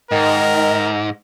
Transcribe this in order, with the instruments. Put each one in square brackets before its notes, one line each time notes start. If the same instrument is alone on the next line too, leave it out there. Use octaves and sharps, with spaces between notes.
[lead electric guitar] G#2 [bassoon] D#3 [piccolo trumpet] A#4